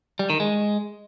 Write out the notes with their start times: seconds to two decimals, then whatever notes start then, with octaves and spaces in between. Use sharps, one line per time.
0.19 G3
0.30 D#3
0.40 G#3